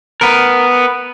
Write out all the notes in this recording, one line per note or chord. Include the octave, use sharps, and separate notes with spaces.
B3 A#4